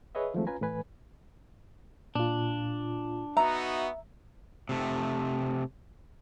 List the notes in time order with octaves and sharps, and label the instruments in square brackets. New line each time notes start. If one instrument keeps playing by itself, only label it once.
[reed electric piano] G#4 B4 C#5 D#5 E5
D#3 F3 F#3 G#3 A3 C4
C#4 F4 B4 G#5 A#5
A2 E3 B4 G#5
[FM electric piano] A#2 F4 [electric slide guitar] D4
[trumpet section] B3 D#4 F#4 [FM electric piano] E5 [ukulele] A#5
[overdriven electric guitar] C3 A3